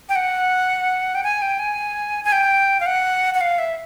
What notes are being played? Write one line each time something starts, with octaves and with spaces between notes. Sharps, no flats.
G5
F#5
G5
G#5
G5
G#5
G#5
G5
F5
F#5
F#5
F5
E5